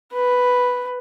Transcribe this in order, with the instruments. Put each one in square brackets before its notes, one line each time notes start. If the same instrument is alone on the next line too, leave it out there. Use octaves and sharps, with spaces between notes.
[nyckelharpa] B4